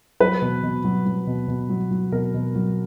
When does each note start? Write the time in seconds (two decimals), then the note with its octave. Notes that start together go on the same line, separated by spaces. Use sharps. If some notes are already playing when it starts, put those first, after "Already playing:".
0.20 F#3 B4
0.42 B2
0.63 B2
0.84 F#3
1.06 F#3
1.27 B2
1.48 B2
1.69 F#3
1.91 F#3
2.12 B2 A#4
2.34 B2
2.55 F#3